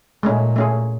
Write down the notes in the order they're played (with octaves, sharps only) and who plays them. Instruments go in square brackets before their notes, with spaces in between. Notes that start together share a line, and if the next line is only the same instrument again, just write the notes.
[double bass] A#2 [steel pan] G#3 A3 C#4
[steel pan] A3 C#4 G#4